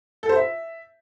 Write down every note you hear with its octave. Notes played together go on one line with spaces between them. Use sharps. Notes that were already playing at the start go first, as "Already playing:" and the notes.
A4
C5
E5